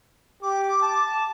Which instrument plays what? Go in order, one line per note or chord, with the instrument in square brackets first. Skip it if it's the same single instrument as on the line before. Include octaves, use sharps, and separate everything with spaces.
[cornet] G4 [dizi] D6
[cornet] A5